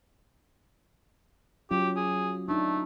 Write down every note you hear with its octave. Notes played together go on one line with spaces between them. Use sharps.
F#3 C#4 F4 G4
G#4
A3 D4 D#4